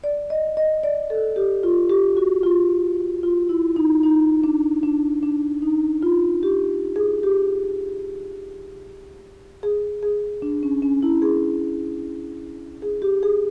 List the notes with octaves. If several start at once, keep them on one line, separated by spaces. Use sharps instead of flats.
D5
D#5
D#5
D5
A4
G4
F4
G4
F#4
F4
F4
E4
D#4
D#4
D4
D4
D4
D#4
F4
G4
G#4
G4
G#4
G#4
D4
C#4
C#4
E4
G#4
G#4
G4
G#4